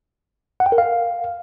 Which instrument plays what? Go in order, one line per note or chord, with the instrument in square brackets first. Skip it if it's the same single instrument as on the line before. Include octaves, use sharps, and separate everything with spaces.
[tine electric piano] F#5
G5
A#4
F5